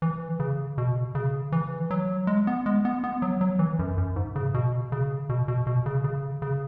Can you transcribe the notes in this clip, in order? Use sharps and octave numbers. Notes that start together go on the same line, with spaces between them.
E3
C#3
B2
C#3
E3
F#3
G#3
B3
G#3
B3
B3
F#3
F#3
E3
F#2
F#2
G#2
C#3
B2
C#3
B2
B2
B2
C#3
C#3
C#3